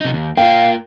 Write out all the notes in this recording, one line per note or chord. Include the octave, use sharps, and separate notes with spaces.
C3 D#4
D#2
A#3 F4 F5 G5